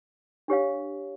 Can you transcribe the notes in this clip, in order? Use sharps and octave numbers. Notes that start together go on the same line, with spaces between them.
D4 G4 C#5 F5